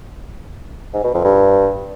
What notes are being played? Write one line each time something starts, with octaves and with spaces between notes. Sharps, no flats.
G#2
B2
F2
G2